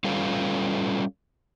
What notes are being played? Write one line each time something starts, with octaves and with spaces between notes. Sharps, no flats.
G3 C#4 F4 A4 B4 F5